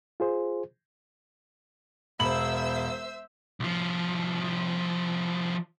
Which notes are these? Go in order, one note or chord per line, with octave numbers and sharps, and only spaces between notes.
F4 G#4 C5
E1 C5 E5 B5 E6 F#7
C2 F3